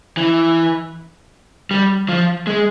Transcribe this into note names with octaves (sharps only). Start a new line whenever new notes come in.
E3
G3
F3
G#3